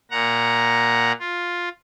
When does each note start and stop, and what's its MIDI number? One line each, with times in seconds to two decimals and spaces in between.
0.11 1.12 46
0.11 1.12 78
0.11 1.12 82
1.20 1.69 65